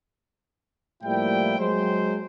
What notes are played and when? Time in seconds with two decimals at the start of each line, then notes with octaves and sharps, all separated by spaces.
1.03 A2 F3 G3 A#3 E4 G5
1.58 F#3 G#3 C5